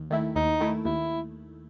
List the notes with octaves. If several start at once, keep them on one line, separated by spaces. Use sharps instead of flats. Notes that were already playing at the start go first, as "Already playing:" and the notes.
Already playing: D#2
D#3 A3 E4
D#2 D#4
D#3 A3 E4
D#2 E4